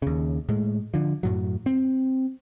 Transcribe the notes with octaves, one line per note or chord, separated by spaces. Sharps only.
D#2 C#3
A2 G#3
D3 F3
F#2 A2 F#3
C4